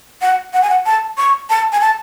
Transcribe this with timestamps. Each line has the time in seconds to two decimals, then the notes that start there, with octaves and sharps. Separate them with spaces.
0.22 F#5
0.53 F#5
0.62 G#5
0.70 F#5
0.86 A5
1.18 C#6
1.50 A5
1.72 G#5
1.81 A5